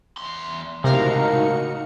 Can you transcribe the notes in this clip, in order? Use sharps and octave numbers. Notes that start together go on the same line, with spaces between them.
E2 C6
C#2 A2 C3 D#4 F#4 A#4 F5 C#7